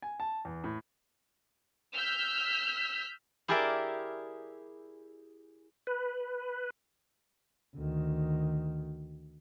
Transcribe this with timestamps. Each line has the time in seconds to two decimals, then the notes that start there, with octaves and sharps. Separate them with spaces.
0.02 G#5
0.20 A5
0.45 E2
0.64 A2
1.94 E6 F6 G6 B6
3.48 E4 G4 G#4 A#4 D5 E5
5.87 B4
7.76 D2 D#3